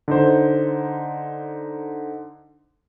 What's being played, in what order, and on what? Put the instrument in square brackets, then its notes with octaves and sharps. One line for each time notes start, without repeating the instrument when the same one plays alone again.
[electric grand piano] D3 D#4 C5